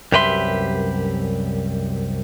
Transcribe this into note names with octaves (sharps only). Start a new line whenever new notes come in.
C2 F#2 G4 B4 E5 C6